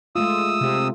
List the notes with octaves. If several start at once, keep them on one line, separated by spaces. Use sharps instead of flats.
G#3 A3 F4 D#6 E6
C3